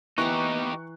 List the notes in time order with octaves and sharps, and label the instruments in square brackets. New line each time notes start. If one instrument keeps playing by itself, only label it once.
[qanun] E3 G5 A#5 [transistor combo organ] B3 [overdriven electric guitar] D#4 G4 [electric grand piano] C#6 F#6